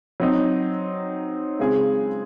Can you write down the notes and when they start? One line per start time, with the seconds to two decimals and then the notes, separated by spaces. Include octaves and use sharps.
0.20 F#3 C4 D#4
1.59 C#3 G#3 C4 F4 G#4